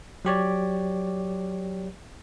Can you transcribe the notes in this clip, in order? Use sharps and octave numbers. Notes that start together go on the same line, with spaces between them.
F#3 G4 C#5 D5